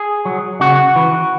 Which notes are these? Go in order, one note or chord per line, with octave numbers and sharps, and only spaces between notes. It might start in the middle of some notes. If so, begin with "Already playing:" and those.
Already playing: G#4
F#3
C#3 F#4
E3